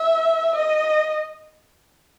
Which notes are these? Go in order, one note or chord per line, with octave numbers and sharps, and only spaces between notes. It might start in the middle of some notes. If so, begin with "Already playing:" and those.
Already playing: E5
D#5